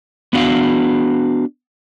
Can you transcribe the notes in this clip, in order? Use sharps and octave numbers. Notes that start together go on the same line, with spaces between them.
B3 D4 F#4 F5